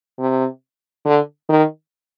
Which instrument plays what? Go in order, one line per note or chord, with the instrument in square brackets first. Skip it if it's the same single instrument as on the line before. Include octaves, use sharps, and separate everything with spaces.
[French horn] C3
D3
D#3